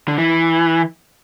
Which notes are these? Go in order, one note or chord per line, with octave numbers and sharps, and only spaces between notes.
D3
E3